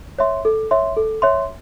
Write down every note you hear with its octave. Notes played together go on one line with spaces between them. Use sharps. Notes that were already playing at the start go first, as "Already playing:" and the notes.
C#5 E5 C6
A4
C#5 E5 C6
A4
C#5 E5 C6